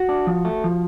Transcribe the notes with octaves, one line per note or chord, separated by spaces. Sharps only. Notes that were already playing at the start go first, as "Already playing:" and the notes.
Already playing: F#4
D4
F3
A3
F3